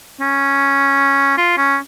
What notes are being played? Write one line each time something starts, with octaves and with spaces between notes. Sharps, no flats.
C#4
F4
C#4